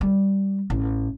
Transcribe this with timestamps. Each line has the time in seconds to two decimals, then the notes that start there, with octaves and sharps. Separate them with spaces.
0.01 G3
0.70 A1